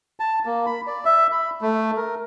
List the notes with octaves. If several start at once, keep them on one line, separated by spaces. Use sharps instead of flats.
A5
A#3
B5
D5
E5
B5
A3
A#4